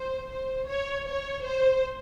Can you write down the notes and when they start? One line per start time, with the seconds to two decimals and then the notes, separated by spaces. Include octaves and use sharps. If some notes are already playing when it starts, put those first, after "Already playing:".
Already playing: C5
0.31 C5
0.68 C#5
1.07 C#5
1.43 C5